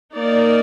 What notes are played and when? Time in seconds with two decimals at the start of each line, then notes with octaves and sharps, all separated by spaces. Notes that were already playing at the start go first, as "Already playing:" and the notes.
0.15 A#3 D#4 A#4 D5